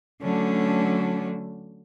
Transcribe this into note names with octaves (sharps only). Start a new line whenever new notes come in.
D3 F#3 A3 C#4 D4